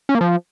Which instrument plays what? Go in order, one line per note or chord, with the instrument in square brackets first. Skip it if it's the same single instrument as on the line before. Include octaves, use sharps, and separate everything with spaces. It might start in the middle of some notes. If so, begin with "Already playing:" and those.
[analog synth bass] C#4
A#3
F3